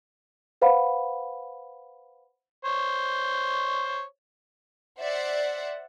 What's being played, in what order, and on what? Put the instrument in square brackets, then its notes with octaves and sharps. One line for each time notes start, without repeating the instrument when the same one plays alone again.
[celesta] B4 C5 F5 F#5 B5
[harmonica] C5 C#5
[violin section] C5 D5 E5 F#5